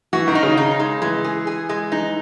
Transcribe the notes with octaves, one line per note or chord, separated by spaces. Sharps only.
E3 F#4
D#3
D#4
C#3
D#4
G#3
E3 G#3
G#4
G#4
G#3
E3 D#4